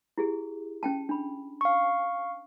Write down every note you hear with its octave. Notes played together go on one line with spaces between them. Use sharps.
E4 G4 G#4
C#4 G5 A5
D4 B5
F5 C#6